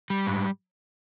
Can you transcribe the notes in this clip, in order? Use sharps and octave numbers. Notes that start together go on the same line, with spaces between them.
G3
G#2